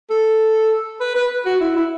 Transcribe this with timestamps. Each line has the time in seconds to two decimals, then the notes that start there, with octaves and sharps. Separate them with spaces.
0.10 A4
1.00 B4
1.15 B4
1.46 F#4
1.61 E4
1.76 E4